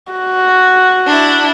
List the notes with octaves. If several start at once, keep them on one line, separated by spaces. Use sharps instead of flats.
F#4
D4 E4